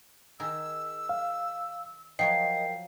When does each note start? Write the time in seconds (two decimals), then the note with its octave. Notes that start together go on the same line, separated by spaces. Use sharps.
0.40 D#3 G#4 A#5 E6
1.09 F5
2.19 F3 F#3 A#4 C#5 D#5 G5 C7